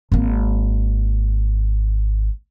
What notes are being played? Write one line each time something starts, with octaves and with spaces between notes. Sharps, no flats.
G#1 A#3